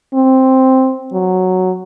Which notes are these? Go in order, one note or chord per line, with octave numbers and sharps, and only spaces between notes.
C4
F#3